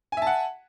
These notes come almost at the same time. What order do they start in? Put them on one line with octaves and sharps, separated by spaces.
G#5 E5 A5 F#5